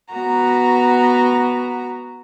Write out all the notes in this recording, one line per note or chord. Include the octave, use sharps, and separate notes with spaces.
B3 F#4 A#5